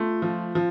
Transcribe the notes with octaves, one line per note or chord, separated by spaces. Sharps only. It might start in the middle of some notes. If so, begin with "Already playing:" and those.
Already playing: A3 F4
F3
F3